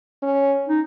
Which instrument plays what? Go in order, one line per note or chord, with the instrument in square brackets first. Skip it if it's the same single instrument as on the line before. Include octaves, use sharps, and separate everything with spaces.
[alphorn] C#4
[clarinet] D#4